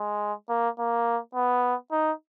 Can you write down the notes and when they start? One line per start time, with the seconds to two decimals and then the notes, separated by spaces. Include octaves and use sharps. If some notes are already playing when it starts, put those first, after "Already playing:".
Already playing: G#3
0.49 A#3
0.79 A#3
1.35 B3
1.92 D#4